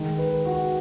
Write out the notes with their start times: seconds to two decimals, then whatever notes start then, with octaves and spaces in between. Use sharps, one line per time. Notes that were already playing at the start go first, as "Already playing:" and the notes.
Already playing: D#3 G#3
0.18 B4
0.45 F#4